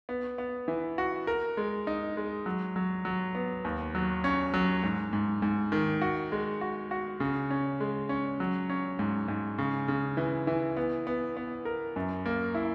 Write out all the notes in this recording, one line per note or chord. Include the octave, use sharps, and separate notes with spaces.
B3
B3
E3
F#4
A#4
G#3
D#4
G#3
F#3
F#3
F#3
B3
D#2
F#3
C#4
F#3
G#2
G#2
G#2
D#3
F#4
G#3
F#4
F#4
C#3
C#4
G#3
C#4
F#3
C#4
G#2
G#2
C#3
C#3
E3
E3
B3
B3
B3
A#4
F#2
A#3
E4